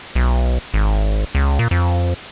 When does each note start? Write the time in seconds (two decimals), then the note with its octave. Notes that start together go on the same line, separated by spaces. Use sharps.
0.15 B1
0.74 G#1
1.35 C#2
1.59 A#2
1.71 F2